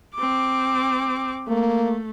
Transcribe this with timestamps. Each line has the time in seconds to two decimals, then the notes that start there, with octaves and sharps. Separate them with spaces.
0.15 C4 D6
1.48 A3 A#3